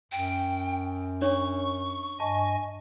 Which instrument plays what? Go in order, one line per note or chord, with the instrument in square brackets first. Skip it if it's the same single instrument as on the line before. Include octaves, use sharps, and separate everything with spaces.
[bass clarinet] F#2 [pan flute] G5
[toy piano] D4 C#5 [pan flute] C#6
[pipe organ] G2 D#5 G#5 [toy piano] A5